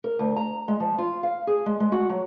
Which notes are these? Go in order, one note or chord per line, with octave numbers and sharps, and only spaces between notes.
A#4
D2
A#5
G#3
F3
F4
F5
G#4
G#3
G#3
F#4
F#3